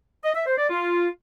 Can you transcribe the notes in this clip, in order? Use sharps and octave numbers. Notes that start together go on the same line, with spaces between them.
D#5
E5
C5
D5
F4